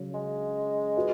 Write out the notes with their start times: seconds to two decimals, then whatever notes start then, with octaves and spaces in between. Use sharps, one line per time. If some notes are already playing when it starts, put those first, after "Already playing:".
Already playing: C#3 F#3 C#4
0.14 G#3
0.96 F#4 B4 D#5